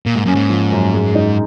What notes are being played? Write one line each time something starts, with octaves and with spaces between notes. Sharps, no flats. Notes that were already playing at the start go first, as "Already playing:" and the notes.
A#2 A#3
G#2
F#2 C#4
G#2
F3
F#2
G#3
D#4